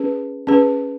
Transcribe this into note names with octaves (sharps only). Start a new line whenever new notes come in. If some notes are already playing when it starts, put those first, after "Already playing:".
Already playing: C#4 G#4 B4
C#4 G#4 B4